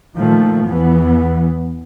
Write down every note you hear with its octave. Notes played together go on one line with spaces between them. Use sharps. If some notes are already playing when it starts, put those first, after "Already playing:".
A#2 D#3 F3 A3
E2 E3 B3